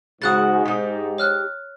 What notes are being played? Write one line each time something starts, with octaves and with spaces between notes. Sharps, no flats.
G#2 C#3 F#4 F#5 D#6 F#6 A6
D#4 G4
C#5 F6 F#6